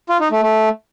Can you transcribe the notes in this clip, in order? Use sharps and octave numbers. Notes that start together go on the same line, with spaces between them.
F4
D#4
A3
A3